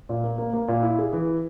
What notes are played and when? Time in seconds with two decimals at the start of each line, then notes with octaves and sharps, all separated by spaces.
0.09 A#2
0.24 A#3
0.38 A#3
0.53 A#3
0.68 A#2
0.83 E4
0.99 G#4
1.13 E3